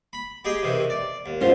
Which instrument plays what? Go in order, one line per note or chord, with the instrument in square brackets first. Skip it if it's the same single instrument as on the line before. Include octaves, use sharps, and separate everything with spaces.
[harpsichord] B5
G4 G#4 D#5
C3 D#3 E3
D5
D#2
[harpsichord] G#2 B2 [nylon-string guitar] C#4 F4 C5